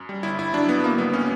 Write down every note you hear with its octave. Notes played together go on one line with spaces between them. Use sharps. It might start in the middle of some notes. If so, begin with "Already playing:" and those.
Already playing: F#2
G3
G1 E4
G1 E4
F#3 D4
G1 B3
F#3 A#3
C#2 B3
F#3 C#4